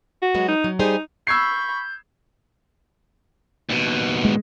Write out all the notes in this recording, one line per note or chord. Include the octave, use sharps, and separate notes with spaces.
F#4
F#3 G#3 B3
D#4
F#3
G3 D#4 G#4 C5
B5 C#6 E6 G6 G#6 C7
D#2 B2
G#3